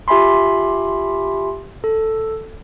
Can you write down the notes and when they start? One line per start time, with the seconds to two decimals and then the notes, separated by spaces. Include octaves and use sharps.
0.08 F4 G4 E5 G#5 B5 C6
1.84 A4